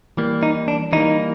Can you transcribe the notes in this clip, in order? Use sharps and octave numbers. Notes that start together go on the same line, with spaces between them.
E3 G3 A#3
D#4
D4
E3 G3 A#3 D#4